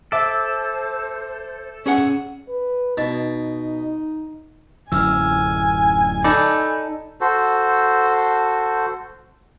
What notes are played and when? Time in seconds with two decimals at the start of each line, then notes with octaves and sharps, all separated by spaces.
0.12 A4 C5 E5 D6 E6
1.86 C#4 G#4 F#5
2.49 B4
2.98 B2 D#4 A5
4.92 D1 F#2 E3 G#5 E6 F6
6.24 D#4 A4 D5 A5 B5
7.21 F#4 A4 C5